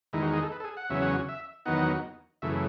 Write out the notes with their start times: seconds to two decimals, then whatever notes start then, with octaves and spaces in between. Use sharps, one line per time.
0.13 E2 D#3 G#3 D#4 E4
0.22 F#4
0.33 G#4
0.43 A4
0.52 B4
0.60 A4
0.64 G#4
0.77 F#5
0.90 E2 C#3 F#3 C#4 E5
1.02 F#5
1.29 E5
1.66 E2 D#3 F#3 B3 D#4 F#5
2.42 F#2 C#3 E3 A3 E5